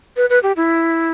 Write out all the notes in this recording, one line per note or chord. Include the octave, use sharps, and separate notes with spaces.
B4
B4
G4
E4